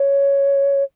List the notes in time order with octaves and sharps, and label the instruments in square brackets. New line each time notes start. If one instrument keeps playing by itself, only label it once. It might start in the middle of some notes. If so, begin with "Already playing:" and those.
Already playing: [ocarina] C#5